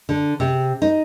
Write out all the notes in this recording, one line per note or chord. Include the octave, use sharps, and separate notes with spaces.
D3
C3
D#4